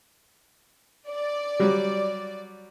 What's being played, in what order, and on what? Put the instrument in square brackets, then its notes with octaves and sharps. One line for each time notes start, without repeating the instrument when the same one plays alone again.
[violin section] D5
[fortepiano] F#3 G3